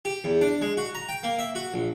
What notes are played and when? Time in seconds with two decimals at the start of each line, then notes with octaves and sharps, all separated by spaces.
0.05 G4
0.24 E2
0.41 D4
0.62 G#3
0.77 F#4
0.95 A#5
1.09 G5
1.23 A#3
1.39 E5
1.55 F#4
1.74 A#1